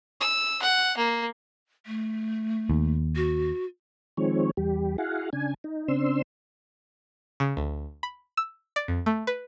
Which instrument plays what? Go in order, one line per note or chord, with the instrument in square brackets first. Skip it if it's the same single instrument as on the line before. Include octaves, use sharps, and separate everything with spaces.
[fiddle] E6
F#5
A#3
[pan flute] A3
[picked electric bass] D#2
[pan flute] F#4
[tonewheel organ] D#3 F3 G#3 C4 C#5
E2 G3 G4
E4 F#4 G#4 F5 F#5
C#3 D4 G#5
D#4
C#3 C4 D4 C6 E6
[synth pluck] C#3
D2
B5
E6
D5
F2
A3
B4